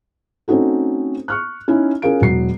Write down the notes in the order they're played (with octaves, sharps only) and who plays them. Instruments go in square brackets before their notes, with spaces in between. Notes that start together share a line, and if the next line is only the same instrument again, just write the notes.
[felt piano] A3 C4 C#4 D#4 F#4 A4
C#6 F6 F#6
C#4 D#4 E4
C#4 F4 G#4 A#4 F5 D7
E1 F#3 C7